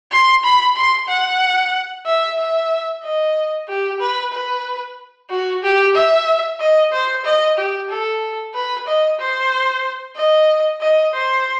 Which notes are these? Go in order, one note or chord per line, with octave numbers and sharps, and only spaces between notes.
C6
B5
C6
F#5
E5
E5
D#5
G4
B4
B4
F#4
G4
E5
D#5
C5
D#5
G4
A4
B4
D#5
C5
D#5
D#5
C5